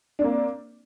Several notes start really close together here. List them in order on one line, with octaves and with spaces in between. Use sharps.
D4 C4 A#3